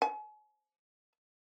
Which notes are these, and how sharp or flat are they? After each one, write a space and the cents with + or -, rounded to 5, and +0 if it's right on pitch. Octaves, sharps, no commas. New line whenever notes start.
G#5 +40